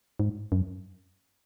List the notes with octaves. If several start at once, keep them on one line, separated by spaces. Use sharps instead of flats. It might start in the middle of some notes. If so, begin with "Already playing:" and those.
G#2
F#2